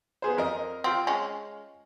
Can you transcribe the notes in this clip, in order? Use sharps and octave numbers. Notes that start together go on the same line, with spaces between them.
B3 G#4 C5
F2 A#4 D#5
C4 F4 F5
G#3 C#4